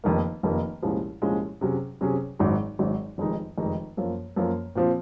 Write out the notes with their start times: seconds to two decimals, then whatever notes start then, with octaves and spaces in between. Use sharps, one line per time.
0.04 F1 F2 D#3 A#3
0.43 F1 F2 D#3 A#3
0.82 C2 A#2 F3 G#3 C#4
1.22 C2 A#2 F3 G#3 C#4
1.61 C3 F#3 C#4 G#4
2.01 C3 F#3 C#4 G#4
2.39 G#1 G#2 F#3
2.79 G#1 G#2 F#3
3.18 F1 F2 D#3 G#3 D#4
3.58 F1 F2 D#3 G#3 D#4
3.97 F#2 F3 A#3
4.36 F#2 F3 A#3
4.75 A#2 F3 C4